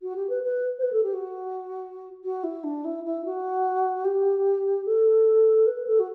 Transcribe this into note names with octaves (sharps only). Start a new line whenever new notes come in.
F#4
G4
B4
B4
C5
B4
A4
G4
F#4
F#4
E4
D4
E4
E4
F#4
G4
A4
B4
A4
F#4